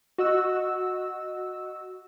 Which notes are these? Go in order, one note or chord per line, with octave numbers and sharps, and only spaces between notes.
F#4 D#5 E6